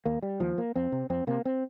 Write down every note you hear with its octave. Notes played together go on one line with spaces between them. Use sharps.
D#2 A#3
G3
D#2 F3
A#3
F2 C4
C3
F2 C4
C3 A#3
C4